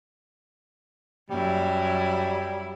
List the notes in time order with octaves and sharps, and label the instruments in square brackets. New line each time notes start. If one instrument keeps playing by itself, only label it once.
[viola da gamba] F#2 E4 [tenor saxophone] G3